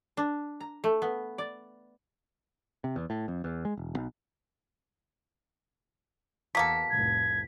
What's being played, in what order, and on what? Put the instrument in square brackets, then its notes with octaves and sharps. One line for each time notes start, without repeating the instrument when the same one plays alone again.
[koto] D4
A#5
A3
B3
D5
[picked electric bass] C3
E2
A2
F2
E2
G#3
E1
B1
[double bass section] E2 [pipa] B2 A#3 A4 [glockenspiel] B6
[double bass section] F1 C2 A2 [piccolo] G#6